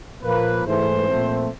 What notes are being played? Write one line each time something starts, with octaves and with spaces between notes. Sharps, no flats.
A#2 F3 A#3 B4
G#2 E3 A3 C5
A#2 F3 A3 C4